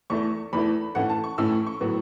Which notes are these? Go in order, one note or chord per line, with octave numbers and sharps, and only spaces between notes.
E2 E3 A3 C#6
E2 E3 A3 B5
A2 E3 A3 C#4 F#5
A5
C#6
A2 E3 A3 C#4 E6
C#6
C#6
A2 F#3 B3